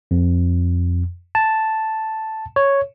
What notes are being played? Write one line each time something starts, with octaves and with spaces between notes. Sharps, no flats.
F2
A5
C#5